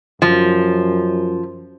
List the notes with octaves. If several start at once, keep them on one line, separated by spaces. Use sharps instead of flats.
F#2 F3